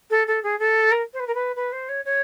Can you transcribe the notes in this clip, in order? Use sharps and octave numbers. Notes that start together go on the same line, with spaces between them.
A4
A4
G#4
A4
A#4
C5
B4
A#4
B4
B4
C5
C#5
C#5